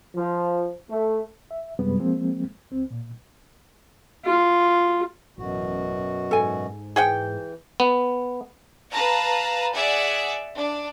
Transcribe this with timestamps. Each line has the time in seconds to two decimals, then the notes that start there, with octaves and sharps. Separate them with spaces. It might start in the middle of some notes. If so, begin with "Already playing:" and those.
0.15 F3
0.90 A3
1.51 E5
1.79 F#2 C3 G3 G#3 B3 B4
2.00 F3 G#3 A#3 C4
2.71 C#2 C4
2.91 A#2
4.25 F4
5.38 A1 F#2 B2 F#4
6.31 G#2 A4 G#5
6.96 E3 G#4 F#5 G5
7.80 B3
8.91 B4 F5 A5 A#5
9.73 G#4 D5 E5 F#5
10.57 D4